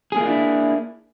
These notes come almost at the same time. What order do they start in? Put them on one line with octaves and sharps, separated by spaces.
G#4 A#3 F4 D4 E4